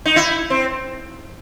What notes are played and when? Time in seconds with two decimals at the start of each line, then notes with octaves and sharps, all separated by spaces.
0.05 D#4
0.16 E4
0.50 C4